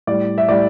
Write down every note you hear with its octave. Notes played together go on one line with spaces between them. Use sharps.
A2 G3 D5
E5
A2 G3 D5